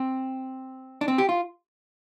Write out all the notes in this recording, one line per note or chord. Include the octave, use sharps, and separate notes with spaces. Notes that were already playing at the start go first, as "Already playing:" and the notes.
Already playing: C4
D4
C4
G4
F4